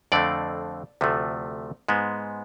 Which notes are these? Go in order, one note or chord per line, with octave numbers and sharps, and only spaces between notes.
F2 D3 A3 C4 D5
D2 C3 F3 A3
G#2 G#3 B3